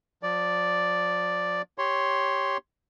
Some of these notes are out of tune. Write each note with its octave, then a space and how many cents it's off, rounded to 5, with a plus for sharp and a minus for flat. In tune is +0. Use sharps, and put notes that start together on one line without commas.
F3 +35 D5 +0
G4 +0 C#5 +0 C6 +0